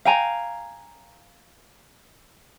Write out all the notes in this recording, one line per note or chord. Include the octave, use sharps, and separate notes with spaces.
F5 G5 G#5 A#5